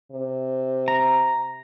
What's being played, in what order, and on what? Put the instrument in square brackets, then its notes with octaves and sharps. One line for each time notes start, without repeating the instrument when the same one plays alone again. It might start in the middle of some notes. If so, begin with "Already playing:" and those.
[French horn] C3
[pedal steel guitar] A#5